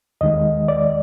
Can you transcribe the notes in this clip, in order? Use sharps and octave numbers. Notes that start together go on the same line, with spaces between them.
D#2 D#3 G#3 D#5
D5